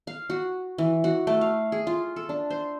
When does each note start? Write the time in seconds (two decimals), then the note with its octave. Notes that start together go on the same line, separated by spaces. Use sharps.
0.07 F5
0.30 F#4
0.78 E3
1.04 F#4
1.27 A3
1.41 F5
1.72 G#4
1.87 F4
2.16 A4
2.29 D4
2.50 C5